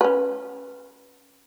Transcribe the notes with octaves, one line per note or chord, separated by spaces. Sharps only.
C#4 B4